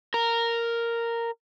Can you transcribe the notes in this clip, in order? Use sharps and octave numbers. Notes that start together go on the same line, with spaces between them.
A#4